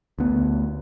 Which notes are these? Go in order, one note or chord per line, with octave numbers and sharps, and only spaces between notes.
D2 B3